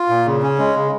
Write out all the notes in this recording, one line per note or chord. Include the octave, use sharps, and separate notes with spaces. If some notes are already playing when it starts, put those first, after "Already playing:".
Already playing: F4
A#2
C#3
C#4
G#3
C#3